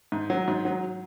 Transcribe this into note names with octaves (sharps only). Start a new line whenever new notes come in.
G#2
F#3
G#2
F#3